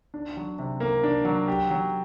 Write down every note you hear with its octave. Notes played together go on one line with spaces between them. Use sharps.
D4
F#3
C3
A#3
D4
F#3
G4
F#3